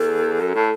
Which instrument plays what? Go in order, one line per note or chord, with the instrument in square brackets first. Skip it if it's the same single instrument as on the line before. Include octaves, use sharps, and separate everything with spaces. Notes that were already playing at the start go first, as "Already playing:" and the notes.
Already playing: [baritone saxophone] E2 [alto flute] A4
[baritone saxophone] F#2
A2